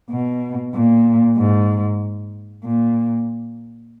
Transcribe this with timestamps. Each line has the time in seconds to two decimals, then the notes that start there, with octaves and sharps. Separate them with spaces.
0.10 B2
0.74 A#2
1.37 G#2
2.64 A#2